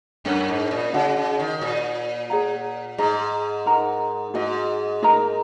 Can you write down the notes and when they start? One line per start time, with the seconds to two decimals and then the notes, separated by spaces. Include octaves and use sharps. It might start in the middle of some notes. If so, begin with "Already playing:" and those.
0.25 F#2 C#4 A#4 C#5 F#5
0.48 G#2
0.71 A#2
0.93 C#3 D#4 F#4 D#5 F#5
1.16 C#3
1.40 D#3
1.61 A#2 F#4 C#5 G#5
2.30 G#4 C#5 F#5 A#5
2.98 G#2 G#4 D#5 A#5
3.66 D#4 A#4 F#5 A#5
4.34 G#2 F#4 D#5 G#5
5.02 D#4 A#4 D#5 A#5